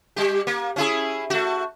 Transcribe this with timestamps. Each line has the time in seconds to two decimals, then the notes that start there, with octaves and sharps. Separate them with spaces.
0.16 G3 G4
0.47 A#3
0.76 C#4 E4 G#4
1.30 A3 F#4